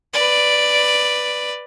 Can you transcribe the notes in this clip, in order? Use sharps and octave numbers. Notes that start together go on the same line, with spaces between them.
B4 D5